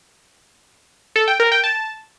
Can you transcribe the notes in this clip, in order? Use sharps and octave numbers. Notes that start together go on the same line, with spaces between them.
A4
G5
A#4
G5
A5